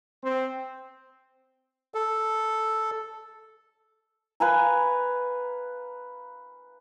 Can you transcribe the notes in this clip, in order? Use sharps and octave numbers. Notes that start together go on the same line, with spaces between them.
C4
A4
B4 F5 G#5 A#5